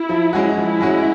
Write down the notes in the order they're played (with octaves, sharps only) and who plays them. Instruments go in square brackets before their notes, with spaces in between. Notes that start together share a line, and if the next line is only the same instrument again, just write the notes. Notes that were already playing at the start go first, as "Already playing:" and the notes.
Already playing: [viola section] E4
[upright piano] F3
G#3 C#4 F#4
[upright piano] F3 [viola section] E4
[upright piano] G#3 C#4 F#4